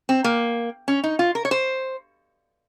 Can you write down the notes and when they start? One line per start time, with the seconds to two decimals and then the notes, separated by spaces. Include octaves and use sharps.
0.09 C4
0.24 A#3
0.88 C#4
1.04 D#4
1.19 F4
1.35 A#4
1.45 C#5
1.51 C5